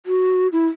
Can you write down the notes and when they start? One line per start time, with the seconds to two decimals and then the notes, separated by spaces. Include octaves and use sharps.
0.06 F#4
0.53 E4